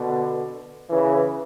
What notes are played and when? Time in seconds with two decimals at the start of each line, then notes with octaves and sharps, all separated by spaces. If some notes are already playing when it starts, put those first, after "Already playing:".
Already playing: B2 D3
0.89 C#3 E3